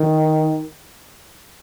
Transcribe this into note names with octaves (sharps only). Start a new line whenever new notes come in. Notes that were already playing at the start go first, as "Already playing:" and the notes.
Already playing: D#3